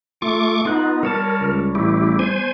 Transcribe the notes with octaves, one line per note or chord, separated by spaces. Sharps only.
A3 F4 C#6 D6
B3 D#4 F4 F#6
G3 A#4 C#5 A5
C#2
A1 E4 G4
B3 C5 G#5